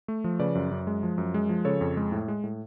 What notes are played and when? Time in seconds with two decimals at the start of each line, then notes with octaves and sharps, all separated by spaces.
0.08 A3
0.24 F3
0.39 C#3 B4 D5
0.55 F#2
0.71 F#2
0.87 G#3
1.03 F3
1.18 F#2
1.34 G#3
1.49 F3
1.65 C#3 A4 C#5
1.81 F2
1.97 G#3
2.12 A2
2.28 G#3
2.44 A2